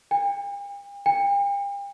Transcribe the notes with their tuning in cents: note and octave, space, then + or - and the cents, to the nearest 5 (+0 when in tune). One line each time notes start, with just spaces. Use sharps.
G5 +45
G5 +40